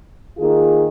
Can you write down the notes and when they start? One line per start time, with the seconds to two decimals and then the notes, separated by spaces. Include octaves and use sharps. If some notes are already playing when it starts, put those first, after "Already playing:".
0.38 D#3 A#3 F4 G#4